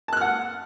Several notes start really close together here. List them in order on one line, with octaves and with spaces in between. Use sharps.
A5 F#6 F6 F#5